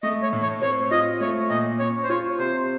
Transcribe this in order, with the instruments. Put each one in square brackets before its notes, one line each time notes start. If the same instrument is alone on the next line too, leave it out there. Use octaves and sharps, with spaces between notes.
[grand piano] A3 [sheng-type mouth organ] D#5
[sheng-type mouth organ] C#5
[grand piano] A2
[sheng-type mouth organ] C#5
[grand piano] C4 [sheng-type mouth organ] C#5
[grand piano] F4 [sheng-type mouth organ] D#5
[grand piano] A3 [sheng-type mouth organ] C#5
[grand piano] A#2 [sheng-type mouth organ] D#5
[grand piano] C#4 [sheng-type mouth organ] C#5
[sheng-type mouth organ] C5
[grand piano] F4 [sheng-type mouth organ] C#5
[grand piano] C3 [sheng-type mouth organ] C5